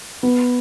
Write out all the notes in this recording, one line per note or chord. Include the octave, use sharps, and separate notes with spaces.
B3